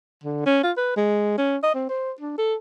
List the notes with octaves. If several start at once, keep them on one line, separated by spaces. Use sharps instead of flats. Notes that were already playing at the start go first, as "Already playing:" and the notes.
D3
C#4
F4
B4
G#3
C#4
D#5
C4
C5
D4
A4